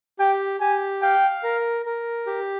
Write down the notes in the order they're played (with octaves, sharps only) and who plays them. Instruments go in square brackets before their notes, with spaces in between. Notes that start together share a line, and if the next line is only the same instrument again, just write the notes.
[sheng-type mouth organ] G4 [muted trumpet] G5
[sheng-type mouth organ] G4 [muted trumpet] G#5
[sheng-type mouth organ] F5 [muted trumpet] G5
[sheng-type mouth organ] A#4
A#4
G4